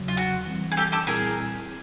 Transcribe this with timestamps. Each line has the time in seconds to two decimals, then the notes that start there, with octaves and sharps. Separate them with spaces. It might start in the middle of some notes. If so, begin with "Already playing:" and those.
Already playing: E2 C#3 F#3
0.08 F4
0.17 F#4
0.47 E3 G3 C4
0.72 G#4
0.77 G4 A4
0.92 G4 A4
1.07 C2 A#2 G3 C4 E4 G#4 A#4